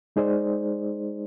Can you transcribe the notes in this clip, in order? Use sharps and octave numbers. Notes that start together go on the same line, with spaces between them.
G#3 D#4 G#4 C5 D5